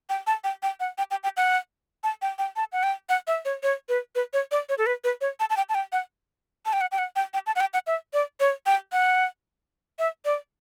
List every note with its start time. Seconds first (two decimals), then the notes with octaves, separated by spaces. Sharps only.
0.09 G5
0.27 A5
0.44 G5
0.63 G5
0.80 F#5
0.98 G5
1.11 G5
1.23 G5
1.37 F#5
2.04 A5
2.22 G5
2.39 G5
2.56 A5
2.72 F#5
2.83 G5
3.09 F#5
3.27 E5
3.45 C#5
3.63 C#5
3.89 B4
4.15 B4
4.33 C#5
4.51 D5
4.69 C#5
4.78 A4
4.86 B4
5.04 B4
5.21 C#5
5.40 A5
5.50 A5
5.57 G5
5.69 A5
5.75 G5
5.92 F#5
6.66 A5
6.73 G5
6.81 F#5
6.92 G5
6.98 F#5
7.16 G5
7.34 G5
7.47 A5
7.56 F#5
7.60 G5
7.74 F#5
7.87 E5
8.13 D5
8.40 C#5
8.66 G5
8.92 F#5
9.99 E5
10.25 D5